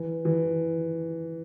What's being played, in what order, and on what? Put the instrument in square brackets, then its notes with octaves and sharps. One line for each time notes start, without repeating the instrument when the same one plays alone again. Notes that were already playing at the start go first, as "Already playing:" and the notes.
Already playing: [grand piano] E3
E3